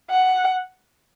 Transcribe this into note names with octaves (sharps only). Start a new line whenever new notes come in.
F#5